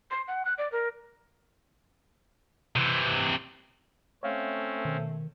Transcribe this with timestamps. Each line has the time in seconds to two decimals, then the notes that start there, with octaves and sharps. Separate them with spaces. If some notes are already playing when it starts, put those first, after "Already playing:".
0.11 C6
0.28 F#5
0.45 F#6
0.58 D5
0.72 A#4
2.76 C3 E3
4.23 A3 C4 C#4 C#5 E5 F5
4.85 B2 D#3